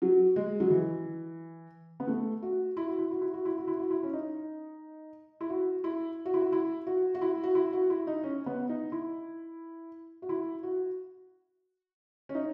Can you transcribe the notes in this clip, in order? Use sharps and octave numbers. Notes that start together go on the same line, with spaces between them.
F#3
G#3
F#3
E3
B3
A3
F#4
E4
F#4
E4
F#4
E4
F#4
E4
F#4
E4
F#4
E4
C#4
D#4
E4
F#4
E4
F#4
E4
F#4
E4
F#4
F#4
E4
F#4
E4
F#4
E4
D#4
C#4
B3
D#4
E4
F#4
E4
F#4
C#4
D#4